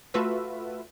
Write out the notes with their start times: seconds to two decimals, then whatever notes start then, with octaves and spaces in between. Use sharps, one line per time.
0.14 A3 F4 F#4 B4 E5